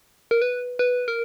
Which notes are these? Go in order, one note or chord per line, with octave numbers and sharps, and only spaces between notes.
A#4
B4
B4
A#4